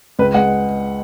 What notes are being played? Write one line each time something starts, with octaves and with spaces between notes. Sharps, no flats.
C#2 B4
G#3 F#5